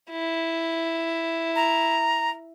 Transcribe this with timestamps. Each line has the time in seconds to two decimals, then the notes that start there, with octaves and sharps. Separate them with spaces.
0.11 E4
1.56 A#5